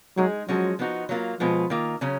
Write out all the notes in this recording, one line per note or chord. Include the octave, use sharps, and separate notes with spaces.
F#3 G#3 D#4 G#4
F3 F#3 G#3 C#4 F#4
F3 B3 D#4 F#4
F#3 A#3 F4
B2 F3 G#3 B3 F4
D#3 A#3 F4
C#3 F#3 C#4